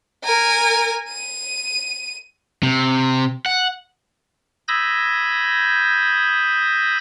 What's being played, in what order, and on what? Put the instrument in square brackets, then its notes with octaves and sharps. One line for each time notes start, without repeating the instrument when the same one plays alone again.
[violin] A#4 G#5
D#7
[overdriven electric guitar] C3
F#5
[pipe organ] B5 D#6 E6 G6 G#6 A#6